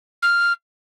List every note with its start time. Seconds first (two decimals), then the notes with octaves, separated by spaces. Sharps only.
0.22 F6